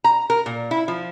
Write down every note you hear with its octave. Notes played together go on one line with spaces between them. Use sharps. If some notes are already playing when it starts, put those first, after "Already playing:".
A#5
A#4
A#2
E4
F3